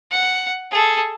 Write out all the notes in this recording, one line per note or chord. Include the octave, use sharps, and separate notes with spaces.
F#5
G#4 A4